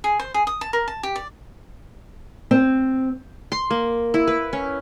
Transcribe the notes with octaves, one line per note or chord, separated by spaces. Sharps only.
G#4
C5
G#4
D#6
A5
A#4
A5
G4
D5
C4
C6
A#3
E4
B4
C#4